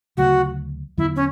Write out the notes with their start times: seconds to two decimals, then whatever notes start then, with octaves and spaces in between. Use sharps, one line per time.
0.17 D2 C#3 F#3 A3 F#4
0.98 E2 D3 F#3 B3 E4
1.16 C#4